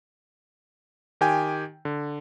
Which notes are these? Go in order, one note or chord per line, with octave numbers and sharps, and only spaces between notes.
D#3 G4 G5 G#5
D3